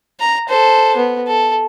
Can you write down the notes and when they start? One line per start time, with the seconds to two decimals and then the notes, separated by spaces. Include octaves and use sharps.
0.20 A#5
0.49 A4 C5
0.96 B3
1.27 A4